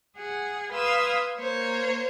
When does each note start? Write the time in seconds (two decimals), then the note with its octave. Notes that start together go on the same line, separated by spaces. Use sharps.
0.17 G#4 F#5
0.73 B4 F5 C6 D#6 E6 G#6
1.38 A#3 C5 C#5